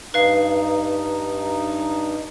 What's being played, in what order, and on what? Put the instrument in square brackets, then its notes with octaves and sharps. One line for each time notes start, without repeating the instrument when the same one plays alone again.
[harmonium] G2 D#4 [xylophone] B4 F5